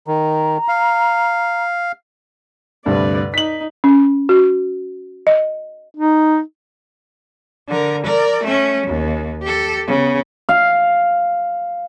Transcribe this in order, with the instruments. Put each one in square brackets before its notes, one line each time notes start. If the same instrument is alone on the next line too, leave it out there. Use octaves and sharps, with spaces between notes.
[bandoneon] D#3 [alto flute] A#5
[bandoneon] F5
[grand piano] D2 G2 C3 [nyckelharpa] B4 D5
[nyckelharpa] D#4 [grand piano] B6 F#7
[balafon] C#4
F#4
D#5
[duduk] D#4
[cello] D3 A#4
A#4 D5
A3 C#4
D#2
G4 A4
C#3 B3
[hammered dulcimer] F5